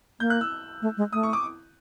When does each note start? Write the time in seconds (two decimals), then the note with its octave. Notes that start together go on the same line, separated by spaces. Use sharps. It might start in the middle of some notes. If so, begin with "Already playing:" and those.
0.20 A#3 G6
0.30 F#6
0.41 E6
0.82 A3
0.97 G#3
1.13 A3 D#6
1.23 C#6
1.33 D6